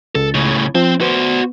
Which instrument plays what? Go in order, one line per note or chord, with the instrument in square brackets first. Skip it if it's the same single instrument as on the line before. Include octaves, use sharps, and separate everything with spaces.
[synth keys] C#2 [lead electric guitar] A4
[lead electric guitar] A2 C#3
[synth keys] F3 [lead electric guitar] C4
[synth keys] B3 [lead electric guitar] F#4 C5